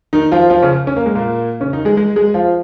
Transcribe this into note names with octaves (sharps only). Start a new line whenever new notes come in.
D#3 D#4
F3 F4
F3 F4
C#3 C#4
C#4
A#3
G#3
A#2 A#3
C#3 C#4
D#3 D#4
G#3 G#4
G#3 G#4
G#3 G#4
F3 F4